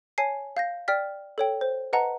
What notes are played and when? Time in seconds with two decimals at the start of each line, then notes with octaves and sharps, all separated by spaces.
0.18 C#5 G#5 A5 C7
0.57 F5 G6 A#6
0.88 D5 G5 F6 B6
1.38 A4 C#5 G5
1.61 C5
1.93 B4 D#5 F#5 A5 A#5